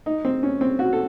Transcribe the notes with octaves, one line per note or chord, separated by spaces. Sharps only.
D#4
C4
C#4
C4
F#4
A4